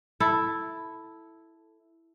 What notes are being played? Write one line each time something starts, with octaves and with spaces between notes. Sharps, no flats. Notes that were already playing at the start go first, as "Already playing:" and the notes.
E4 A4